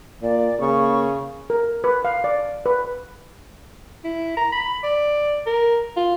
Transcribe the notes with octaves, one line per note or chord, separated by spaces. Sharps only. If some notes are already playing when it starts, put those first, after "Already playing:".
A#2 D5
C#3 A#3 C#6
A#4
B4
F5
D5
B4
E4
A#5
B5
D5
A#4
F4